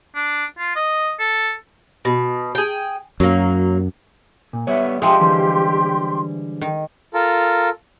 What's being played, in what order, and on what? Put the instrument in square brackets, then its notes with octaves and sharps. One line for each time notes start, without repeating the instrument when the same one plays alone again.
[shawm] D4
F4
D#5
A4
[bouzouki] B2
G#4 G5
[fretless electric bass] F#2 [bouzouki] F#3 A#3
[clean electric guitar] A#2
[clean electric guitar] G3 B3 C#5 [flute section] E5
[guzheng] F3 G#3 [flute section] G4 C6 [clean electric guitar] G#4 E5 G5
[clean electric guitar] D3 E3 G3
[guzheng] D#3
[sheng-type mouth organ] F4 A4 A#4